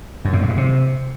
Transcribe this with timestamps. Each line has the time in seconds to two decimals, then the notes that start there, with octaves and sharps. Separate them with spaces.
0.25 F#2
0.33 A2
0.41 G2
0.49 G#2
0.57 C3